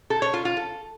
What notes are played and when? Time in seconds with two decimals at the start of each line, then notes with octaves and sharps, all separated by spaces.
0.10 A4
0.22 C#5
0.34 F4
0.45 F4
0.57 A4